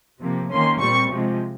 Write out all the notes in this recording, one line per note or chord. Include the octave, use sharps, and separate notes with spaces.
C3 F3 A#3
D#3 A#3 C#4 C6
A#2 G3 C4 C#6
C3 F3 G#3